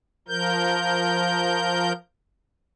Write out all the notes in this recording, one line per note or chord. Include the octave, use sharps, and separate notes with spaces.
F3 A#4 G6